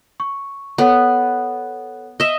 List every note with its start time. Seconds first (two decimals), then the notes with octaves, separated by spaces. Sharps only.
0.20 C#6
0.78 B3 A4 C#5 F#5
2.20 D#5 E5